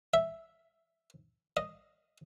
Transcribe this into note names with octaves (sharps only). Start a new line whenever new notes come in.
E5
D#5